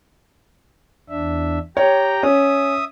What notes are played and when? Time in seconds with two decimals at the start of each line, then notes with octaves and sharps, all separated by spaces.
1.09 E2 D4 E5
1.77 G4 C#5 G5 A#5
2.23 C#4 E5 D#6